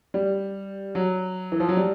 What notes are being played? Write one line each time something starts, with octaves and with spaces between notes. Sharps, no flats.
G3
F#3
E3
F3
F#3
G3